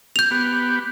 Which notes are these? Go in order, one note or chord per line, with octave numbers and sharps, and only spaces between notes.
G6 F7
B3 G4